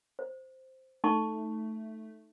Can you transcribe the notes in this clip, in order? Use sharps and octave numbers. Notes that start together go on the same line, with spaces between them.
C5
A3 D#4 A5 C#6